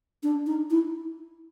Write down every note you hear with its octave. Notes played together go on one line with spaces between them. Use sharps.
D4
D#4
E4